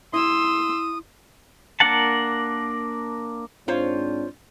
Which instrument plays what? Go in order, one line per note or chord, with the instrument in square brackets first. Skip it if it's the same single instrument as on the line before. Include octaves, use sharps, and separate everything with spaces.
[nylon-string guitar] E4 [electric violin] C6 E6 [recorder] D#6
[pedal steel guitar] A#3 D4 A#4 F#5 A5
[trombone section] G#2 C4 D4 [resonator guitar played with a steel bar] F4 C5 C#5